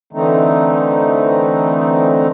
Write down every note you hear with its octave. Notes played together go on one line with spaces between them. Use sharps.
D3 E3 A3 C4 D#4